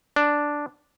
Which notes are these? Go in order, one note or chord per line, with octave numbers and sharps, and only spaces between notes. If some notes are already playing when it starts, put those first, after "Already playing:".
D4